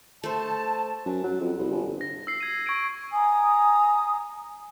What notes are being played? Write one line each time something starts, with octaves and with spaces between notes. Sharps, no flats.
A3 C5 A5
F#2
F#3
F2
C2
G1
A#6
E6 C7
G#6 D#7
C#6 G#6 C7 D7 D#7
G#5 A#5 D#6